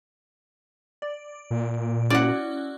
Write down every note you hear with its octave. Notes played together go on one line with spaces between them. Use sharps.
D5
A#2
C#4 E4 F#4 D5 F#5